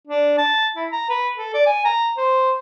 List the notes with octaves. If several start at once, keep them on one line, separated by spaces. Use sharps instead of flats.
D4
A5
E4
A#5
B4
A4
D5
G#5
A#5
C5